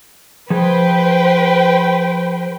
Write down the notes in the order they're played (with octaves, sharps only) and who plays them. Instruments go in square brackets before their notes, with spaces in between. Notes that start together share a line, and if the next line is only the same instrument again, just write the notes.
[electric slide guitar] F3 G#4 [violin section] B4 C5 G5